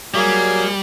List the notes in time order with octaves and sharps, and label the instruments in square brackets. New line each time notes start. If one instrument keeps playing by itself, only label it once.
[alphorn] F#3 [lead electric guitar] G3 [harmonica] A#3 G#4